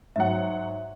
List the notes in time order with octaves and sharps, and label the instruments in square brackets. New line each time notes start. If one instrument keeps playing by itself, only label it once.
[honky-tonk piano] G#2 F#3 F#5 [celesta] E5